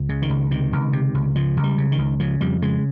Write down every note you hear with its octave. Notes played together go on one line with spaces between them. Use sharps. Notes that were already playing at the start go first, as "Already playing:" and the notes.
Already playing: C#2
C#3
D#3
C#2
C3 D#3
C#2
C3
C#2
C#3 F3
C#2
G3
C#3
D#3
C#2
C#3 F3
F2 G3
C#3 G#3